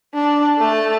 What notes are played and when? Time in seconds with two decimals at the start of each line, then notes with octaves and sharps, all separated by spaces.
0.14 D4
0.57 A3 A5